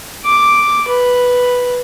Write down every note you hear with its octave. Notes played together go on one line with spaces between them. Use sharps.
D6
B4